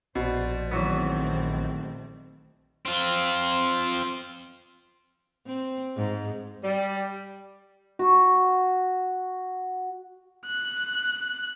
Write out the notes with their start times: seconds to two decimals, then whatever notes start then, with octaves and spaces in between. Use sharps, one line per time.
0.15 A#1 B2 C5 D5
0.71 E2 D#3 F#3 A3 B3 C4
2.85 C4 F4
5.46 C4
5.96 G#2
6.63 G3
7.99 F#4 C#6
10.46 F#6